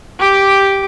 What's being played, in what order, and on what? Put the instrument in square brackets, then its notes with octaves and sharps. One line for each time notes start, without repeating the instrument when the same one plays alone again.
[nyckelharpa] G4 D6